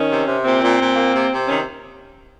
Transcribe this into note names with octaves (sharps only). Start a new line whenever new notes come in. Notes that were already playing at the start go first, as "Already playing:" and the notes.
Already playing: D#3 C#4
C3
C3
A#2 C4
A#2
A#2
A#3
C3
C3
D#3 C#4